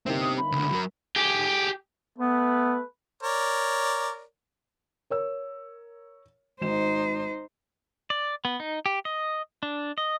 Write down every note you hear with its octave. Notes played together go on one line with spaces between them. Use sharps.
G1 A#3 C4 D#4 G4
D#6
B5
C#2 D3
F#3 A#4
G4 G#4
A3 B3 B4
A#4 C#5 D5
A#4 C#5 E6
G#1 D#4 C5 E7
D5
B3
D#4
G4
D#5
D4
D#5